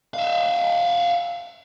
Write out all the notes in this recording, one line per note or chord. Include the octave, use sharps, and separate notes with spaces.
E5 F5